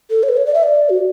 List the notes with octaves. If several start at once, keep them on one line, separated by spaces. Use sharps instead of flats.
A4
C#5
B4
C#5
D5
E5
D5
F#4